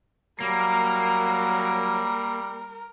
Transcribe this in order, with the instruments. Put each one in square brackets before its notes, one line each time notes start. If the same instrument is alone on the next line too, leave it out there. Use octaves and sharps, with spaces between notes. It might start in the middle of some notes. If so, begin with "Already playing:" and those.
[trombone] F#3 [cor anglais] G3 [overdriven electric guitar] A#3 [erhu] A#4